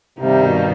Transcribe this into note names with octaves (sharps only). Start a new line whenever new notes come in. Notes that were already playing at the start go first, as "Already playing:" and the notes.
G2 C3 D#3 G3 A#3 D#4
B2